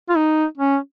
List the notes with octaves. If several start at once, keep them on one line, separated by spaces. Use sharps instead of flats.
F4
D#4
C#4